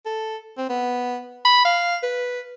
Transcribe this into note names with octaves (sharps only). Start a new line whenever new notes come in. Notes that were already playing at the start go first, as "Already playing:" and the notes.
A4
C4
B3
B5
F5
B4